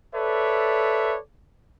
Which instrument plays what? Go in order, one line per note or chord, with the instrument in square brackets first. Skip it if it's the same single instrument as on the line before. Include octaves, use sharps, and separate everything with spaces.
[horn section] A4 B4 C#5 D5 E5